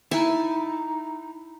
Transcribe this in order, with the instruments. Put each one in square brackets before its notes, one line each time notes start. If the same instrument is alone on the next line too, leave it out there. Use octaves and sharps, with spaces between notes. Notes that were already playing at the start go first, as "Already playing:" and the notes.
[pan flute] D#4 [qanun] E4 G#5 A5